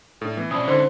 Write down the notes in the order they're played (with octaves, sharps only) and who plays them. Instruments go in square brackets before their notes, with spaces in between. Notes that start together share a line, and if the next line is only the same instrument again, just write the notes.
[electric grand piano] A2 [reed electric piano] D4 A4
[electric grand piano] E3 [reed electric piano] A3 B3
[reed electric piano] B2 A5 [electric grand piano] C4 [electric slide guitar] C#4 F4 D5 [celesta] B5 D#6
[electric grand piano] D3 [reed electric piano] D#4 [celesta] C5 C6